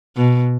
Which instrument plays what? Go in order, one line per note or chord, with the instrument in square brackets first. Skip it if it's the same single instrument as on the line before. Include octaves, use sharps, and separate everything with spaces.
[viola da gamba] B2